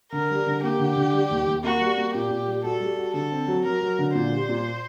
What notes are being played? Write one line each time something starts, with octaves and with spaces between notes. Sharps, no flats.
D3 A#4
G3
D3
A#3 G4
D3
D3
G3
D#2
D#2
A#3 F#4
G3
A#3
A#2 G4
A#2
G3
F#4 A4
G3
F#4
D3 A4
C4
F#3
F#3 A#4
F#3
D3
A#2 C5
G3
A#2